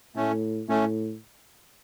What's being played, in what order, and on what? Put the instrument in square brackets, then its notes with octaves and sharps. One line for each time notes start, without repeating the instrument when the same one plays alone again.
[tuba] A2 [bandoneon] A3 C#4
[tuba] A2 [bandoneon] A3 C#4